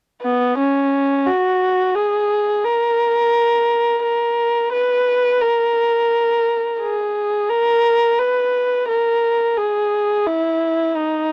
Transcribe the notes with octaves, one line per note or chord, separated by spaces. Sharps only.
B3
C#4
F#4
G#4
A#4
A#4
B4
A#4
G#4
A#4
B4
A#4
G#4
E4
D#4